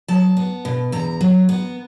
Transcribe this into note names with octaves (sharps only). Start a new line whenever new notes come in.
F#3 A5
B3
B2
E2 A#5
F#3
B3